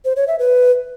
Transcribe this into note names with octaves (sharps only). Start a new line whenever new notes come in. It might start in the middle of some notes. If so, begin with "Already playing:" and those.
C5
C#5
E5
B4